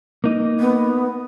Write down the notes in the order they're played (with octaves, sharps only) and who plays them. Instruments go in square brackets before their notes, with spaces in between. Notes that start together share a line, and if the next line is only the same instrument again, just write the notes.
[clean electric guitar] A#3 D#4
[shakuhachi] B3